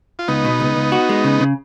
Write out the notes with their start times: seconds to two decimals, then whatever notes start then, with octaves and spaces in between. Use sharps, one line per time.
0.19 F4
0.28 C#2 B3 D#4
0.45 B2
0.60 C#2
0.77 C#2
0.92 F#4
1.09 G#3
1.24 C#3
1.41 C#3